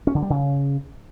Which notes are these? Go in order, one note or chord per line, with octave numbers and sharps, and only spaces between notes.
C#4
D3
G3
C#3